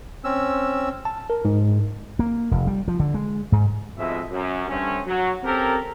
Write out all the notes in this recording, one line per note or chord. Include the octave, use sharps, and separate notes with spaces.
C4 C#4 E6
A5
A#4
G#2
A#3
F1
G3
F3
D3
G#3
G#2
F2 G#2 B2 G#3 D#5 E5
F#2
G2 D3 A3 C4 C#4
F#3
C4 C#4 G4 A4 A#4